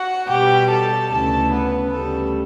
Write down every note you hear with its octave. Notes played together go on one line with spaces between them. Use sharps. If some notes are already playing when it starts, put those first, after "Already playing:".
Already playing: F#4 F#5
B2 G3 G4 G5
A4 A5
D2 C#3 E3 A4 A5
B3 B4
D2 C#3 G3 A4